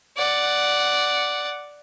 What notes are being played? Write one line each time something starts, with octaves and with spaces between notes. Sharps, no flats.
D5 F#5